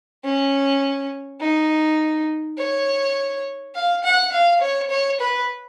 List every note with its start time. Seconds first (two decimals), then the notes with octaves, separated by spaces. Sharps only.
0.24 C#4
1.41 D#4
2.58 C#5
3.75 F5
4.04 F#5
4.33 F5
4.61 C#5
4.90 C#5
5.20 B4